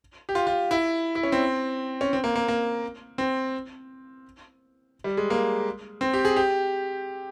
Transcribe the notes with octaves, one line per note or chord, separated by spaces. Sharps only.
G4
F4
F4
E4
E4
C#4
C4
C#4
C4
A#3
A#3
A#3
C4
G3
G#3
A#3
C4
G4
G#4
G4